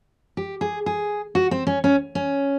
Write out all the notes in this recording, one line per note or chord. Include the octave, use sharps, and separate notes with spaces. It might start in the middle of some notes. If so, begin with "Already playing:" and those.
G4
G#4
G#4
F#4
C4
C#4
C#4
C#4